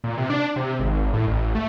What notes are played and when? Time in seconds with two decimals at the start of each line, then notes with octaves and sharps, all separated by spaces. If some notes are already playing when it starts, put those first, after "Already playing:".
0.04 A#2
0.17 C3
0.30 D4
0.56 C3
0.79 G#1
1.13 A2
1.27 A1
1.55 A3